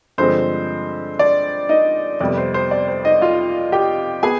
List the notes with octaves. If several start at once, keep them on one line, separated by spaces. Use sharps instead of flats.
G2 D3 F3 G#3 C4 C5
D5
D#4 D#5
F2 C3 G3 B3 D5
C5
C5
D5
C5
D#4 D#5
F4 F5
G4 G5
B3 G#4 G#5